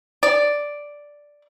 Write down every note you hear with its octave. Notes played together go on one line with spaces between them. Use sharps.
D5